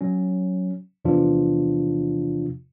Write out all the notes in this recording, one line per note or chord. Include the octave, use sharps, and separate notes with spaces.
F#3 C#4
E2 C3 E3 F3 D4 F4